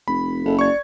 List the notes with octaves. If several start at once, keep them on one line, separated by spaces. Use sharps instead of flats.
F1 B5
F#1 A4
D5 C#6 G#6